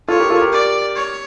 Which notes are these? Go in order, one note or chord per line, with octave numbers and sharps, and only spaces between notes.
F4 A4 C#5
G4 A#4
F4 A4
G4 A#4
D5
C#5